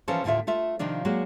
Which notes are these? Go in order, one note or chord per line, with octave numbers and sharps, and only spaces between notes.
E3 F3 C#4 A4 A#4 C5
D#2 A2 D3 G#3 F4 E5
A3 F4 E5
C3 D#3 F3 D4 F4
F#3 G#3 A#3 D4 F#4